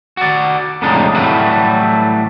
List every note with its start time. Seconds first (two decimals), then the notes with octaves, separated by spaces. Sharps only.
0.17 F#4 D5
0.82 F2 A2 C#3 G#3 D4 D#4
1.15 A2 E3 F#3 G3 A3 F#4